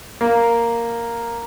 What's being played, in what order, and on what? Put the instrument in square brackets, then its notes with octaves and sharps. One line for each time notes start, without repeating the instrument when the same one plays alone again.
[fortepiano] A#3